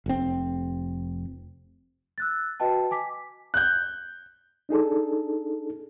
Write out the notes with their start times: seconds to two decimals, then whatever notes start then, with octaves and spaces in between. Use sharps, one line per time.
0.06 F1 C4
2.18 E6 F#6 A6
2.60 F#4 B4 D#5 G5 A5
2.91 G#5 D6 B6
3.54 F#6 G6
4.69 D4 D#4 G#4 A4